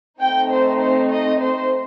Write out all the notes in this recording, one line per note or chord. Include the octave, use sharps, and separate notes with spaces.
A3 C4 D#4 G5
C5
C5
D#5
C5